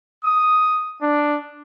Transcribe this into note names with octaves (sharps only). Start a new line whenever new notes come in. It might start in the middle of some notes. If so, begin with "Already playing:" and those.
D#6
D4